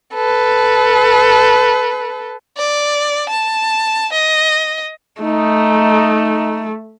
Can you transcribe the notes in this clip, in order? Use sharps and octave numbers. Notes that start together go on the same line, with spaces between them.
A4 B4
D5
A5
D#5
A3 D#4